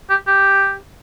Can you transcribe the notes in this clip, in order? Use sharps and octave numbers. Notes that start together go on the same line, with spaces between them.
G4
G4